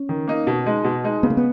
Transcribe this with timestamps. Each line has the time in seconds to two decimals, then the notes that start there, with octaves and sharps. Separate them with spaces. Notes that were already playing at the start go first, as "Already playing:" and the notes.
Already playing: C#4
0.09 D#3
0.28 A#3 D#4
0.47 B2
0.66 G#3 D#4
0.84 B2
1.04 G#3 D#4
1.23 C#3 B3
1.30 A#3
1.37 B3